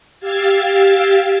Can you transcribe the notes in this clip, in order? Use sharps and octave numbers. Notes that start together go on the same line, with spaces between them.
G4 F5 E6 G#6 A6